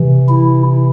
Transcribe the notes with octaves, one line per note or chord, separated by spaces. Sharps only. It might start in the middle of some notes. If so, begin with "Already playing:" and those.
Already playing: C3 E3
E4